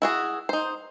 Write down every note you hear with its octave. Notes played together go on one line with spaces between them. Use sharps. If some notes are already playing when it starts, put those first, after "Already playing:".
E4 F#4 G#4
D#4 C5